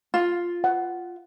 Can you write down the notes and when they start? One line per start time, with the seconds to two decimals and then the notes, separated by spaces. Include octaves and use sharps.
0.14 F4
0.64 F#5